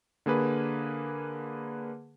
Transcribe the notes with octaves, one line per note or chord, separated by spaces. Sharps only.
D3 A#3 G#4 B4